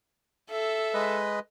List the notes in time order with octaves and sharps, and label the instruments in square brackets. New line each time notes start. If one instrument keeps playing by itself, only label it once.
[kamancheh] A4 E5
[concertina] G#3 B4 D#5